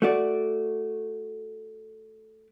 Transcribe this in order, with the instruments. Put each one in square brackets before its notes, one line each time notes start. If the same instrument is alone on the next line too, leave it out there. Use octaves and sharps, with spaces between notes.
[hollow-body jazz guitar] A3 F#4 D5